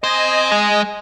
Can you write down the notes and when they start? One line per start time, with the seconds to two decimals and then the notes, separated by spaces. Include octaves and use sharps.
0.04 C4 C5 D#5 G#5
0.52 G#3